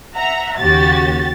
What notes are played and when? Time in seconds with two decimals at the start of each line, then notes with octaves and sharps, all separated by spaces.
0.15 E5 F#5 A#5
0.58 D#2 C#3 F#4 G4 A6